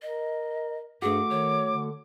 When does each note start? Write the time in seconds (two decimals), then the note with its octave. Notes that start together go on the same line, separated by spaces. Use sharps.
0.02 A#4 D#5
1.02 G2 A3 F#4 G#4 D6
1.30 D#3 C#5
1.70 D3